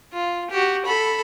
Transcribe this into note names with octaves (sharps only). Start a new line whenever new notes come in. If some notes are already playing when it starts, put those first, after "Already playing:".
F4
F#4 G4
A4 B5